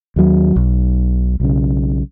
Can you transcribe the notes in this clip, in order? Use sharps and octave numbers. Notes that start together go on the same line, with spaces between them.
D#2 F#3
B1
B1 C#3